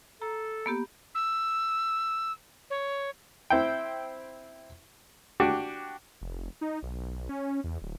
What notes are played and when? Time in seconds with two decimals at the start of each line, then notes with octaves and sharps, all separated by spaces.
0.22 A4 A#5
0.66 A#3 B3 G4
1.15 E6
2.70 C#5
3.50 C4 E4 G5
5.40 D4 F#4 G4
6.21 F1
6.61 D#4
6.82 B1
7.29 C#4
7.64 E2
7.82 D1